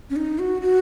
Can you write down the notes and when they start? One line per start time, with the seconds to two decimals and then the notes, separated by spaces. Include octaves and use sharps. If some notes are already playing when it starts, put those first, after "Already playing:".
0.10 C#4
0.16 D#4
0.39 F#4
0.62 F#4